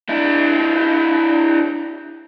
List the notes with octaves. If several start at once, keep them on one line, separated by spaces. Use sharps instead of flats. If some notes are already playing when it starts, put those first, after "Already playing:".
D4 E4